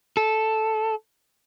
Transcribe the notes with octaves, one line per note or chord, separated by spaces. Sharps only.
A4